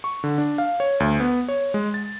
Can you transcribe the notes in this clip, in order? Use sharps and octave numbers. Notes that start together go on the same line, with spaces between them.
C#6
D3
D4
F5
C#5
D2
B3
C#5
G#3
A6